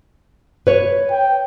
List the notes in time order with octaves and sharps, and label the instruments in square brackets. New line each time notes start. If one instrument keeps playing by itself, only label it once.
[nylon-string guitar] B4 C#5
[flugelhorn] G5